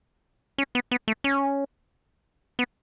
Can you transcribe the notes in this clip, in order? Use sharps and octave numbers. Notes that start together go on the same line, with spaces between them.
C#4
B3
B3
A3
C#4
B3